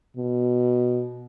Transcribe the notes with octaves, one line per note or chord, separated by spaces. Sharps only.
B2